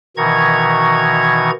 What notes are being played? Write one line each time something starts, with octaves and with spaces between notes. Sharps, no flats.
B2 D#3 E3 A#5 C#6 G#6